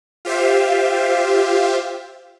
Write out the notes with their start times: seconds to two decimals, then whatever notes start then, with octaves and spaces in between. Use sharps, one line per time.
0.25 F4 G4 C5 E5 F5